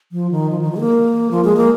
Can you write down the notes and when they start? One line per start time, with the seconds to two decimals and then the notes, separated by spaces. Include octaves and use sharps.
0.12 F3
0.31 D#3
0.51 F3
0.61 D#3
0.72 F3
0.76 G#3
0.80 A#3
1.31 F3
1.45 G#3
1.57 A#3